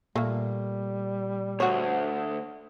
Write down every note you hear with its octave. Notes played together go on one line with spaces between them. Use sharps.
A#2 G3 A3 A#3
D2 F#4 C#5